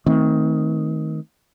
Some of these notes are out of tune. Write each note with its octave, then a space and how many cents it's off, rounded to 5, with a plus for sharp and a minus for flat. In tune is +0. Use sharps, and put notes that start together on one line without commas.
D#3 +20 A3 +0 C4 +0